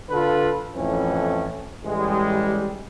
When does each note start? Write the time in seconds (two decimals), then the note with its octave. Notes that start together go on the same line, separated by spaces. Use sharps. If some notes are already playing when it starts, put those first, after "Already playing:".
0.10 D3 F4 A4 B4
0.74 F2 A2 E3 C#4
1.84 A1 G3 G#3